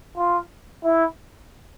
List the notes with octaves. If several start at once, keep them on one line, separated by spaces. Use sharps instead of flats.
F4
E4